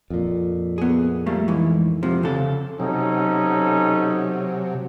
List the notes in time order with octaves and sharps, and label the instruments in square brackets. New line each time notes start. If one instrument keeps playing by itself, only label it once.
[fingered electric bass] F2 A#2
[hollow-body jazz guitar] B3 G#4
G3 A3 A#3
G#2 E3
C3 F3
C#3 A4
[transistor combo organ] C3 F#3 [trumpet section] C#4 D#4 A4